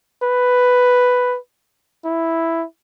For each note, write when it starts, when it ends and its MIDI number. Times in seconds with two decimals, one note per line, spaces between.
0.23 1.37 71
2.05 2.64 64